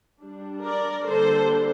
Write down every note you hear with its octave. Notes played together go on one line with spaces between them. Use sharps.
G3 D4
A#4 D5
D3 G3 A#3 D4 A4 C5